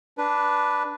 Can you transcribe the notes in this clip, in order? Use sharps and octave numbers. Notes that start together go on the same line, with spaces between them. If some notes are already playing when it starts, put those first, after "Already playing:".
D4 B4